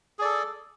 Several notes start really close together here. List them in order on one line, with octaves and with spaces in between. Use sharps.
G#4 D5 A4